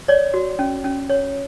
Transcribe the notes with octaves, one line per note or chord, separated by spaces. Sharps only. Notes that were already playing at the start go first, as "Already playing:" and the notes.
C#5 D5
F#4
C#4
C#4
C#5